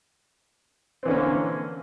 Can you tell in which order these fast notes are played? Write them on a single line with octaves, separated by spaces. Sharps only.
C4 E3 D3 C#4 A#3